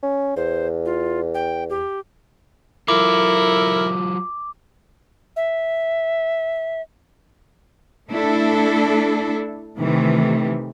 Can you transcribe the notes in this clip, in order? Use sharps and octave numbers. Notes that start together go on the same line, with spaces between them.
C#4
E2 C5
F4
G5
G4
F#3 E4 F4 A4 A#4 D6
E5
A3 D4 E4 A4
C3 D#3 E3 A3